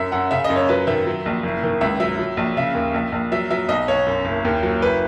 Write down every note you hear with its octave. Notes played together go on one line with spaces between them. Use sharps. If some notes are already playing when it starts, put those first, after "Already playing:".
Already playing: F#2 E5
F#2 F#5
C#3 E5
D#5
F#2
C#5
F#3 B4
D#3 E5
F#3
A#1
F#1
D#3
C#2 E5
F#3 E5
F#3
A#1
C#3 E5
D#2
A#1
A#1
F#3 E5
F#3 E5
B1 D#5
B1 C#5
F#2
F#1
D#2
F#3
F#1 B4